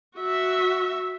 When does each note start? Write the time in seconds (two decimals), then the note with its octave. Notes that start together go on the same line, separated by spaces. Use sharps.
0.17 F#4 E5